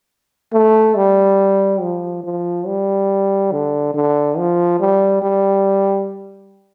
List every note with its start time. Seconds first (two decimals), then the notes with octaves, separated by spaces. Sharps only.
0.53 A3
0.96 G3
1.81 F3
2.24 F3
2.66 G3
3.52 D3
3.94 D3
4.38 F3
4.80 G3
5.22 G3